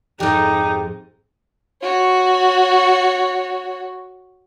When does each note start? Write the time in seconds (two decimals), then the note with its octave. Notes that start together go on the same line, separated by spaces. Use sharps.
0.20 F2 G#2 D#4 G4
1.83 F#4 C#5